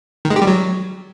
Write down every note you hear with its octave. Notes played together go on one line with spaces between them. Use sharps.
D#3
G#3
G4
G3
F#3